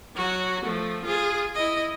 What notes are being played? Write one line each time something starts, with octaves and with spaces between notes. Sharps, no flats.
F#3 F#4
F3 A3
F4 G#4
E4 D#5